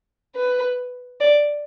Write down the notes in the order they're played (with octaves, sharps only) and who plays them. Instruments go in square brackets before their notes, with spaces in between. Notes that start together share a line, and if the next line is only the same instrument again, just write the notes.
[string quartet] B4
D5